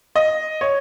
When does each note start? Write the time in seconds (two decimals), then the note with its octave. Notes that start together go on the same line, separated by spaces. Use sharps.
0.16 D#5
0.61 C#5